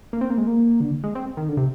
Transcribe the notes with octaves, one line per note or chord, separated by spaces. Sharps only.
A#3
C4
A#3
G#3
A#3
D3
G#3
C4
D#3
D3
C3